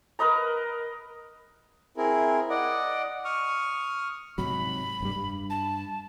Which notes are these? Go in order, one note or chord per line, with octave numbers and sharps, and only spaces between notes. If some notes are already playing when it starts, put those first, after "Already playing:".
A#4 B4 D#5 A#5
C4 E4 G#4 A#4
D5 D#5 F#5
C#6 D#6 F6
G#2 C3 F#3 B5
F1 G2 G3
G2
A5